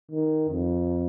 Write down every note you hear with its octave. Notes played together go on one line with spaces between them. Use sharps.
D#3
F2